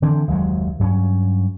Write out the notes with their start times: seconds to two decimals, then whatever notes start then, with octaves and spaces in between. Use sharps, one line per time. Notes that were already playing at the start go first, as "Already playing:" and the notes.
0.02 D3 E3 C4 D4
0.28 F#1 D#2 F#3 G#3
0.79 G2 F#3 C4 C#4